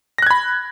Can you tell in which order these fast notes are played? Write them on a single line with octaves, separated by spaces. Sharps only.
A#6 F#6 G#6 B5